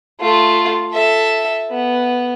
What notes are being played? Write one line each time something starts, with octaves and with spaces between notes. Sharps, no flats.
A3 F4
A4 E5
B3